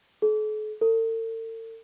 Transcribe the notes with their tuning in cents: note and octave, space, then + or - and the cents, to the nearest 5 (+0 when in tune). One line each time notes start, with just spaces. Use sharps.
A4 -45
A4 +45